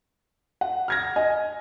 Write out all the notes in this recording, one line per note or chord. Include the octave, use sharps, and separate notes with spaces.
F#5
F6 G#6 A#6
D#5 G#5